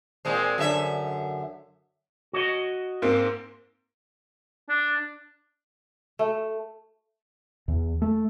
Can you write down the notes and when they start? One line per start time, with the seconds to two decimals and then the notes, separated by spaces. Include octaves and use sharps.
0.25 A#2 G#3 C4
0.58 F#2 D3 E5
2.33 F#4 C#5 D#5
3.02 G#2 A#3 C4
4.69 D4
6.19 A3
7.68 E2
8.02 A3